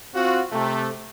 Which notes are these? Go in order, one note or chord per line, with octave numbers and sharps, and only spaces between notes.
C4 F4 F#4
C3 A3